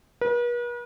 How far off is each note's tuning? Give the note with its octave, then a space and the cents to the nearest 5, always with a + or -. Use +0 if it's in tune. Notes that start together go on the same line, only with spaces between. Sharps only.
B4 -45